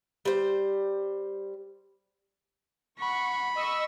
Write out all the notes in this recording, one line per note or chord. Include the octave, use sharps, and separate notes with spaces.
G3 C5
F#5 B5 C#6
D#5 C#6 E6